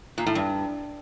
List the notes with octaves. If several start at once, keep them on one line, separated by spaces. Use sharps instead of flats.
A#2
A2
G2